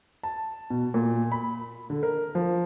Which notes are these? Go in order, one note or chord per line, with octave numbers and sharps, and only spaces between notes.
A5
B2
A#2
B5
D3
A#4
F3